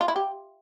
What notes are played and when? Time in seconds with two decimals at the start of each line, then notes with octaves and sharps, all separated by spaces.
0.01 F4
0.08 E4
0.16 G4